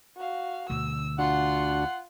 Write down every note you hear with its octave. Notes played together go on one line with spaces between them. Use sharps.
F#4 F5
D2 B2 D3 E6
D4 F4 F#4 F#5 C6